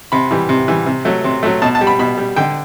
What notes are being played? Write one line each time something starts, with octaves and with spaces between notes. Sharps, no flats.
C3 B5
E3 G3
C3
E3 G3
C3
F#3 A3
C3
F#3 A3
B2 A5
A5
G3
B5
B2 B5
G3
D3 G5